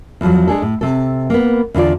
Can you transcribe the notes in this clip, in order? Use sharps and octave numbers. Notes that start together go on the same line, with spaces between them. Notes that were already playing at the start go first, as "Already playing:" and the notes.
E2 F3 F#3
G#3 D4 G#4 A4
A2
C3 A4
A#3 B3
E2 D3 F4 D5